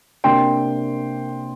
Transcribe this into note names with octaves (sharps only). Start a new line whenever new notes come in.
C3 A#3 D4 G5 C6